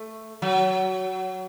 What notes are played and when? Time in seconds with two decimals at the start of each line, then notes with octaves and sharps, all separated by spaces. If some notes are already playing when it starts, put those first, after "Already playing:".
Already playing: A3
0.42 F#3